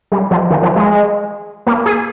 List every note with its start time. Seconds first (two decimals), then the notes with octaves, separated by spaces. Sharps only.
0.12 G3
0.31 F3
0.50 D#3
0.63 F3
0.76 G#3
1.67 A#3
1.86 G#4